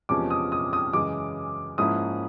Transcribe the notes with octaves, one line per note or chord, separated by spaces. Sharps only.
E2 C3 F3 G#3 C#4 D6
D#6
D#6
D#6
F#2 C#3 E3 G#3 D6
G#2 F3 A#3 C#4 E4 D#6